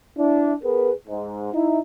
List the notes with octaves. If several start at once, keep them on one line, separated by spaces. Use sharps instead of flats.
D4 E4
B3 G#4 A#4 B4
G#2
D#4 E4